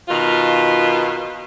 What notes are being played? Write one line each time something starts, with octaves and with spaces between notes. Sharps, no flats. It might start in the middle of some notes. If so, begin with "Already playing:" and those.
B2 D#3 F4